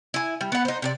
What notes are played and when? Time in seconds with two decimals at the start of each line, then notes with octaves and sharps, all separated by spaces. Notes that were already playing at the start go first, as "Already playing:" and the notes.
0.14 E4 G#5
0.41 G3
0.52 B3 F#5
0.65 D#4 C5
0.82 C3 G#4 D5